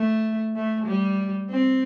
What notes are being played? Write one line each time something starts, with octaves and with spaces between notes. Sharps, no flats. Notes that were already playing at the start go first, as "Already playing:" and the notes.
Already playing: A3
A3
G3
C4